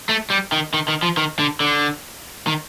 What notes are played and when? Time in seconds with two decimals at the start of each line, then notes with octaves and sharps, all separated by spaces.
0.09 A3
0.30 G3
0.52 D#3
0.74 D#3
0.88 D#3
1.03 F3
1.17 D#3
1.39 D3
1.60 D3
2.47 D#3